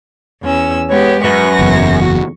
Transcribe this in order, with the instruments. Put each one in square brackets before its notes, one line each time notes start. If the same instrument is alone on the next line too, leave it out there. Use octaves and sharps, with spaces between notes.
[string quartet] E2 C#4 E6
[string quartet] G#3 B3 G4 [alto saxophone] C#5
[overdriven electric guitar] F#2 [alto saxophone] B4 [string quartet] C#6 A#6
[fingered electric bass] F#1 E2
[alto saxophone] F#4